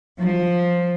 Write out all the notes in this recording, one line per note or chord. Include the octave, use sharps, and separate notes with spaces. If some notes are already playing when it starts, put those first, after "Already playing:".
F3